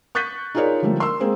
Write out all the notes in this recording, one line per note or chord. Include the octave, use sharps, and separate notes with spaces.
C#6 F#6 G6 A6 B6 D#7
D#4 F4 G#4 A#4 C#5 D5
D3 F3 G3 A3 A#3
A#4 C6 E6
G#3 A#3 C4 G#4